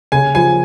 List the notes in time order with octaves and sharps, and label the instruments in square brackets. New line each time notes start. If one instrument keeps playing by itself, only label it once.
[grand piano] C#3 [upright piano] G#5
[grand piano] F3 [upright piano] G#5